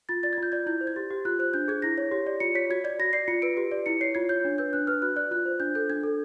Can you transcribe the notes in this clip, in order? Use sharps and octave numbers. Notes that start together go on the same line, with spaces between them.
F4 A6
D5 A6
G#6
F4 G6
D5 G#6
E4 G6
C5
G#6
G4 A6
G4
F4 F#6
C5 F#6
D4 G6
G#4 G#6
E4 A#6
C#5
G4
D5
F4 C#7
C#5 B6
F#4 G#6
D5 G#6
F#4 A#6
D5 C7
F4 C#7
B4 D7
G4
D5
E4 C#7
C#5 C7
F4 G#6
C#5 G6
D4
B4 G6
D4 F#6
B4 F6
F#4 F#6
D5 F#6
F4 F#6
C5
D4 G6
A4 G6
D4 G#6
A4